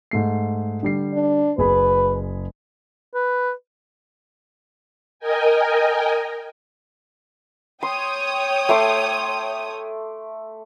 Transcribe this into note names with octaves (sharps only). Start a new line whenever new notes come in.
G#2 A3 C7
D3 G3 C7
D4
F#1 G#4 B4 B5
B4
A#4 D#5 G5 G#5
C#5 G5 C6 D#6
A3 C6 D6